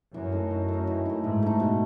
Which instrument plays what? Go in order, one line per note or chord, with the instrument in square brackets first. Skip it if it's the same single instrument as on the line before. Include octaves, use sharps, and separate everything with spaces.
[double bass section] F#2 [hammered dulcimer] E3
[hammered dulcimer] A3 D#4
E3
A3
D#4
E3
A3 D#4
[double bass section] G#2 [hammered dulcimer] E3
[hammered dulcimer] A3 D#4
B2